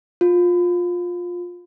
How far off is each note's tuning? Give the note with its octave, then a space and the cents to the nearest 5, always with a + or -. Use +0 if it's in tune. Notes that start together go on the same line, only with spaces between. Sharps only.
F4 +20